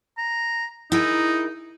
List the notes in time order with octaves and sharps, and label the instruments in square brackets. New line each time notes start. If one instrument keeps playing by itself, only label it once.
[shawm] A#5
[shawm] D#4 [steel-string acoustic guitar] E4 G#4 A#4